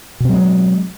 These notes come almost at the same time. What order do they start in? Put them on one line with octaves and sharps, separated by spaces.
B2 C4 F#3 G#3